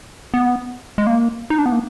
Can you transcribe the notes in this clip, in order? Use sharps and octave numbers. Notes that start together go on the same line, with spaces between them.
B3
G#3
A#3
D#4
D4
B3
A#3